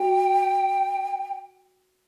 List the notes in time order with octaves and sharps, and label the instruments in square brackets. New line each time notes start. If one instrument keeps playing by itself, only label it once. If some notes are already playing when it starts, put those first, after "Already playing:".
Already playing: [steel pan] F#4 [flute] G5